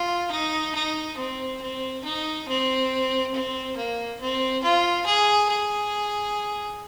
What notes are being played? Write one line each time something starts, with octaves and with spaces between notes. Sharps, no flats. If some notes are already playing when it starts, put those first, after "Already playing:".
Already playing: F4
D#4
D#4
C4
C4
D#4
C4
C4
A#3
C4
F4
G#4
G#4